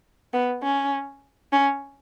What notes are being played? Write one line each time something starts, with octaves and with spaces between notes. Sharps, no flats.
B3
C#4
C#4